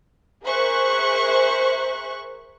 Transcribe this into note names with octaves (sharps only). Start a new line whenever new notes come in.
G#4 A#4 C5 E5 C#6 F#6